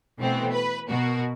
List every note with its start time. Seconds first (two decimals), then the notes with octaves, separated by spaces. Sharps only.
0.19 B2 E3 A3 B3 C4
0.52 B4
0.88 B2 F#4 A#4